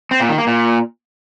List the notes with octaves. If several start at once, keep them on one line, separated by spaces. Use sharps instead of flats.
C4
A#2
D#3
A#3
A#2